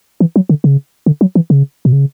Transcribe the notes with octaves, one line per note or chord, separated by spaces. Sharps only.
E3
F#3
D3
C#3
D3
F#3
E3
C#3
B2
C#3